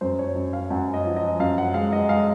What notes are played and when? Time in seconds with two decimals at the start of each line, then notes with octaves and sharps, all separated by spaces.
0.01 F#2 C5
0.19 C#5
0.35 F#2
0.53 F5
0.70 F#2 F#5
0.94 D#5
1.06 F3
1.16 D#5
1.39 F#2 F5
1.58 F#5
1.74 G#3 F5
1.93 D#5
2.09 G#3 F5